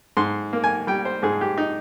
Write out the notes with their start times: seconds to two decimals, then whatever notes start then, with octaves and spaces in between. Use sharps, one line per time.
0.17 G#2 C6
0.53 A#3
0.64 G#5
0.87 G3 G5
1.05 C5
1.23 G#2 G#4
1.41 G4
1.58 D#4